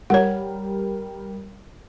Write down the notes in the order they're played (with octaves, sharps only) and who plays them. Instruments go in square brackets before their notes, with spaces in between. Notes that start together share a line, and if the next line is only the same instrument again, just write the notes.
[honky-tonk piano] G3 A#4 [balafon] C#5 F#5